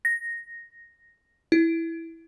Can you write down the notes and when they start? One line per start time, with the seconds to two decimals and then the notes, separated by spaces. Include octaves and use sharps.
0.05 A#6
1.52 E4